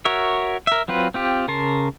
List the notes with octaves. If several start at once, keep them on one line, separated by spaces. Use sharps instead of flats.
F#4 A#4 C#5 E5
A#4 E5
F#3 C4 F4 B4
C4 F4 G4
C#3 A#4 A5 C6